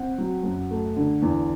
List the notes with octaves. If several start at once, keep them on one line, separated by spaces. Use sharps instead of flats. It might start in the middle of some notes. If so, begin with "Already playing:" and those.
Already playing: C4 F#5
F#3
F#2
A3
D3
E2